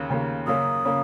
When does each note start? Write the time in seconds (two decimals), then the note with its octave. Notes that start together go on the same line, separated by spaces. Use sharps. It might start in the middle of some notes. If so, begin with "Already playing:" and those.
Already playing: D#2 C#3 A#3
0.10 D#2 C#3 A#3
0.47 F#2 C#3 A#3 C#4 D#6
0.85 C#3 A#3 C#4